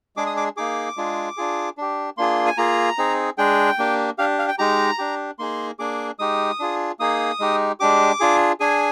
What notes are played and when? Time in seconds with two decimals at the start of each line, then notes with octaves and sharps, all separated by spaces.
0.17 G#3 D4 G#4 D6
0.26 D#6
0.37 D6
0.57 A#3 D#4 G#4 D6
0.97 G#3 D4 F4 G#4
1.37 D4 F4 G#4
1.78 D4 G4
2.18 A#3 D4 F4 G#4 C6
2.46 G#5
2.58 A#3 F4 G#4 A#5
2.98 C4 D#4 G#4
3.38 G#3 D4 G#4 G5
3.78 A#3 D4 G4
4.18 D4 G4 F5
4.39 F5
4.48 G5
4.59 G#3 D#4 G4 A#5
4.98 D4 G4
5.39 A#3 D#4 G#4 C6
5.79 A#3 D4 G#4 D6
6.19 G#3 D#4 G4 D#6
6.60 D4 F4 G#4
6.99 A#3 D#4 G#4 D#6
7.40 G#3 D#4 G4
7.80 G#3 D4 G4 D6
8.20 D4 F4 G#4
8.60 D4 G#4 G#5